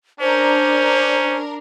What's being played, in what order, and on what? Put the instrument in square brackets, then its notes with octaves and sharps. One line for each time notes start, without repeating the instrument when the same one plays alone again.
[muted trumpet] C#4 [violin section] D4 A#4 [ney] C5